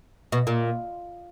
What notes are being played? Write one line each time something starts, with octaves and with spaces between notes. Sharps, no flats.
B2
A#2